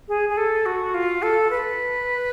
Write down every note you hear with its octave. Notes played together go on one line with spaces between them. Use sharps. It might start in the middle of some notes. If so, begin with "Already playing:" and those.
G#4
G#4
A4
F#4
F4
A4
B4